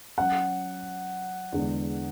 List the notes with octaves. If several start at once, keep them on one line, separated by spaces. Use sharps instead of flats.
F#3 C#4 F#4 F#5
E2 D3 G#3